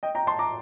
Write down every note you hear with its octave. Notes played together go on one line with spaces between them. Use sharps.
D#5 G5
G5 A#5
A5 C6
A#5 D6